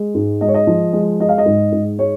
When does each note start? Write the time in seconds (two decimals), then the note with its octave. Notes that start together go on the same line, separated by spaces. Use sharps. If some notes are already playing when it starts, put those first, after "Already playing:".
Already playing: G#3
0.15 G#2
0.41 G#3 D#5
0.48 C#5
0.54 D#5
0.67 F3
0.93 G#3
1.20 G#3 D#5
1.29 F5
1.38 D#5
1.46 G#2
1.72 G#2
1.98 G#3 C#5